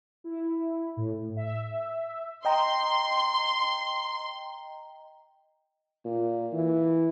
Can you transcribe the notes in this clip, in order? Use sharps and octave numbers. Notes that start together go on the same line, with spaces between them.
E4
A2
E5
D#5 G5 A#5 C6
A#2
E3